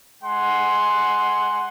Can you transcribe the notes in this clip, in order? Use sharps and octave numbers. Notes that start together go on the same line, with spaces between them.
G#3 F#5 G#5 C6